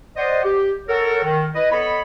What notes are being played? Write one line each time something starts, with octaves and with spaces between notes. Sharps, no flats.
C5 D5 D#5 F#5
G4
A4 A#4 C#5 F#5
D#3
E4 B4 D#5
B3 A4 C#5 D#5 B5